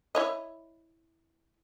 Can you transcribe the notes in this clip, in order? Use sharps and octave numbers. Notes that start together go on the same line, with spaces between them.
E4 C#5 D#5